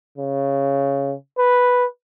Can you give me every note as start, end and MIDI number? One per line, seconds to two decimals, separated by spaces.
0.18 1.14 49
1.38 1.85 71